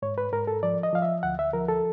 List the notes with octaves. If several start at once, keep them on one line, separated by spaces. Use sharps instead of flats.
G#2 C#5
B4
G#2 A#4
A4
F3 D5
D#5
F3 F5
E5
D2 F#5
E5
F3 A#4
A4